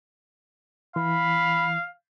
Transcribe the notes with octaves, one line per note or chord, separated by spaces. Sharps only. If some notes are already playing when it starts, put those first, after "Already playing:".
E3 F5 B5